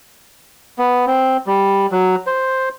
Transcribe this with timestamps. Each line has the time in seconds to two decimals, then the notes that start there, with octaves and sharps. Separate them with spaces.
0.79 B3
1.07 C4
1.47 G3
1.92 F#3
2.27 C5